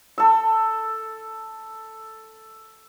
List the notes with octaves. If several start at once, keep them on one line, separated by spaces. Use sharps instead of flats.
A4 E6